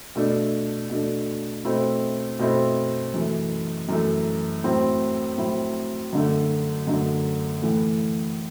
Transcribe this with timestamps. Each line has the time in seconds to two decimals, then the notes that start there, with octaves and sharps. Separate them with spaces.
0.15 B2 A3 D4
0.90 B2 A3 D4
1.65 B2 A3 C4 E4
2.39 B2 A3 C4 E4
3.14 F#2 E3 A3
3.89 F#2 E3 A3
4.64 A2 F#3 C4 E4
5.38 A2 F#3 C4 E4
6.13 F#2 D3 A3
6.87 F#2 D3 A3
7.62 A2 E3 A3